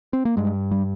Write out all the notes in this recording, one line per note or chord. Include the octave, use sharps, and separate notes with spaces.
C4
A#3
G2 G#3
G3